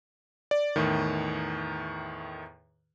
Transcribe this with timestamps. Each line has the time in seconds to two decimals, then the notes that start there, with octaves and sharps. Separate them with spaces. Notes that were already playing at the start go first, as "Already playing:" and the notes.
0.51 D5
0.76 E2 A2 D#3